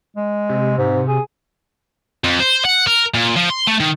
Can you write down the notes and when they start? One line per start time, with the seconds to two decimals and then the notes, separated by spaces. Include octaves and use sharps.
0.16 G#3
0.49 C3
0.78 G#2
1.08 G#4
2.24 F2
2.40 C5
2.65 F#5
2.87 A#4
3.14 A#2
3.36 F3
3.50 C6
3.67 A3
3.80 D#3